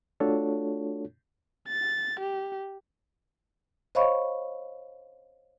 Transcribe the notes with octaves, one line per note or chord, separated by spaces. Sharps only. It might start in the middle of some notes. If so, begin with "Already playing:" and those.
A3 D4 F4 F#4 A4 C#5
A6
G4
C5 C#5 D#5 F5 B5 C#6